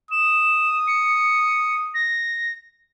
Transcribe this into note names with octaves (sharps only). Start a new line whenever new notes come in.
D#6 E7
C#7
A#6